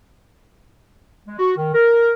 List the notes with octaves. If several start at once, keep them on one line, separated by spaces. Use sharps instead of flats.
G#3
F#4
D#3
A#4